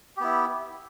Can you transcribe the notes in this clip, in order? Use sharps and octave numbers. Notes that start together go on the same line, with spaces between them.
B3 E4 G4